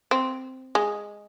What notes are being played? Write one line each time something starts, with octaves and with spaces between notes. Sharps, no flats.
C4
G#3